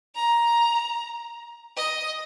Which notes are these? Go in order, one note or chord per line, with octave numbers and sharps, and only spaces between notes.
A#5
D#5